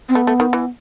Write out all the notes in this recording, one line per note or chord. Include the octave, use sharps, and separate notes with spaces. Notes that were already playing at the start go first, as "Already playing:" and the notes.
C4
A3 B3
A3
D#3
E3